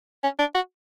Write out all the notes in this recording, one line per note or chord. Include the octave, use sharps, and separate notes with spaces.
C#4
D4
F#4